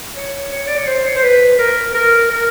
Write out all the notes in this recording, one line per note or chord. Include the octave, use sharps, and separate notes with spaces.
C#5
C#5
D5
C#5
C5
C#5
C5
B4
A#4
A#4
A#4